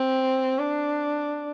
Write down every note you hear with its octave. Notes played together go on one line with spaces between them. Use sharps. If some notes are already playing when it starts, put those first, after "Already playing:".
Already playing: C4
D4